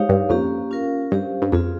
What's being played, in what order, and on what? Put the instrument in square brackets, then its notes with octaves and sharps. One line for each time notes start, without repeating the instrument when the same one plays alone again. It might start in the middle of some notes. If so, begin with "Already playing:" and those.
Already playing: [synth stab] G#2 [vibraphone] D#4 G4 C#5 F5
[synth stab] G2
[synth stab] F2 [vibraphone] A#3 C#4 G4
[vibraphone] C#4 F4 A#4 F5
[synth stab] G2 [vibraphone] C#4 G4 C5 F5
[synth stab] G2
[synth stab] F2 [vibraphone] C4 F4 G#4